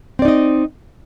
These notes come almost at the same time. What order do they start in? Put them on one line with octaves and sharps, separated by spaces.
C4 D5 D#4 D#5